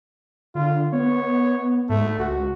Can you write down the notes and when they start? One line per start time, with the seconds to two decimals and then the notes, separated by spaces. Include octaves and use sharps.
0.55 D3 F4
0.93 B3 C#5
1.90 G#2 A3
2.19 C#2 F#4